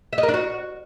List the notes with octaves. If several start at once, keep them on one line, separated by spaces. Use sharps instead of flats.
E5
D#5
A#4
D4
F#4